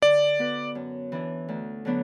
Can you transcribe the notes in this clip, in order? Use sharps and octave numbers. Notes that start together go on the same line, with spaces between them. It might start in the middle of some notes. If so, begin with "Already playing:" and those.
D3 D5
B3 F#4 B4
F#2
E3 D4
D2
D3 F#3 B3 D4